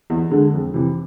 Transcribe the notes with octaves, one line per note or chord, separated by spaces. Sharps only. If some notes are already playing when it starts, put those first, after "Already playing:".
E2
D3 G#3
F2
C3 E3